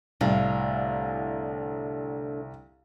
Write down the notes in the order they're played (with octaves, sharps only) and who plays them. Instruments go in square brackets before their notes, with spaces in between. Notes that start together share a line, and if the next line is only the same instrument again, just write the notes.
[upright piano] C2 [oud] A2 D3 [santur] F5 A5